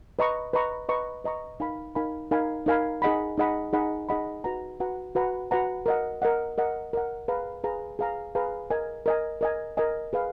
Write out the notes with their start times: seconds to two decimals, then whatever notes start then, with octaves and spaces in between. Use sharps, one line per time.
0.19 B4 D#5 A#5 C#6
0.54 B4 D#5 A#5 C#6
0.89 B4 D#5 A#5 C#6
1.24 B4 D#5 A#5 C#6
1.60 D#4 A#4 F5 G#5 B5
1.95 D#4 A#4 F5 G#5 B5
2.31 D#4 A#4 F5 G#5 B5
2.66 D#4 A#4 F5 G#5 B5
3.02 D#4 G#4 D#5 F#5 B5
3.38 D#4 G#4 D#5 F#5 B5
3.73 D#4 G#4 D#5 F#5 B5
4.09 D#4 G#4 D#5 F#5 B5
4.44 F#4 B4 F#5 A#5
4.80 F#4 B4 F#5 A#5
5.15 F#4 B4 F#5 A#5
5.51 F#4 B4 F#5 A#5
5.86 A#4 D#5 F#5
6.22 A#4 D#5 F#5
6.58 A#4 D#5 F#5
6.93 A#4 D#5 F#5
7.28 G#4 B4 F5 A#5
7.64 G#4 B4 F5 A#5
7.99 G#4 B4 F5 A#5
8.35 G#4 B4 F5 A#5
8.70 A#4 D#5 G#5
9.06 A#4 D#5 G#5
9.41 A#4 D#5 G#5
9.77 A#4 D#5 G#5
10.13 G#4 B4 F5